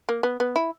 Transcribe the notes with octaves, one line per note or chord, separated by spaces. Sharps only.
A#3
B3
B3
E4